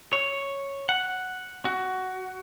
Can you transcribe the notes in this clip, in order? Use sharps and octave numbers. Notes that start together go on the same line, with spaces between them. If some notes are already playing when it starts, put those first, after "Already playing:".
C#5
F#5
F#4